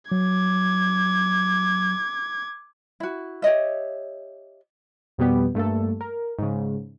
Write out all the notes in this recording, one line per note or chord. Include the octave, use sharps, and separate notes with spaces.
F#3 D6 G#6
E4 F#4
G4 C#5 D#5 E5
F2 B2 G3 B3 G4
G2 A3 A#3 A4
A#4
G#2 C#3